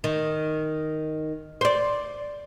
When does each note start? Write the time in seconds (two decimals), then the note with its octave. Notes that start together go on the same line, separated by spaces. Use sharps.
0.04 D#3
1.61 C5 D5